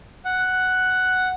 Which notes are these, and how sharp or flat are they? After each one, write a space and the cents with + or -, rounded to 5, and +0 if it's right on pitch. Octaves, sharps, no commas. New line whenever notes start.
F#5 +5